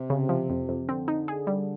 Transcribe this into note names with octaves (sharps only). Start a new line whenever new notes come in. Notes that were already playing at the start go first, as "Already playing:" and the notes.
Already playing: C3
C#3
F3
F2
F2
D3 C4
D#4
G#4
G3